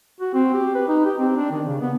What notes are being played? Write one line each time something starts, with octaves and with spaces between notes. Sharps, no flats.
F#4
C4
G4
B4
D#4
G4
C4
D4
D#3
C#3
B3